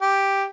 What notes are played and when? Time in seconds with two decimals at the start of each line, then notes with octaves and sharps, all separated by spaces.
0.01 G4